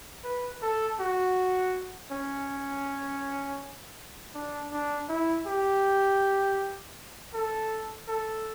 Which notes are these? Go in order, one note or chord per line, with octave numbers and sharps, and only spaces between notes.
B4
A4
F#4
C#4
D4
D4
E4
G4
A4
A4